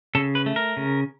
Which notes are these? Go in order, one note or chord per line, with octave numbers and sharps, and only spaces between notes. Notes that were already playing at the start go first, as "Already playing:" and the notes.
C#3 A4
B4
A3
A#4
C#3